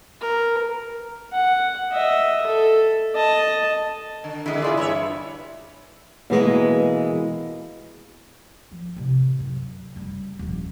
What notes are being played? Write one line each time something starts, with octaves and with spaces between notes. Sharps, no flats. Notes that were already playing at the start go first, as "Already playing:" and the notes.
A#4
F#5
D#5 E5
A4
D#5 A5
D3
D3 E3 G#3 E4
A#2 E4 F4 G#4 D5
G2 G3 E4 C#5 E5
B2 E3 G#3 A#3
F3
A1 C3
F#2
F#1 G3
D#1 F3